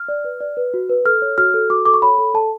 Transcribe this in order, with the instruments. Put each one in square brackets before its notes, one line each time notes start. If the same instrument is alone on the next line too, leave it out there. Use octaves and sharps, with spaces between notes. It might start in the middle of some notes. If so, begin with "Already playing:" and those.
Already playing: [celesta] F6
D5
B4
D5
B4
F#4
B4
A4 F6
C#5
F#4 F6
A4
F#4 D6
A4 D6
C#6
C#5 B5
A4
A4 A5